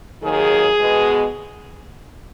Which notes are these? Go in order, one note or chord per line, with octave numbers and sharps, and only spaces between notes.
D#2 D#3 F#3 G#4
B2 G#3 B3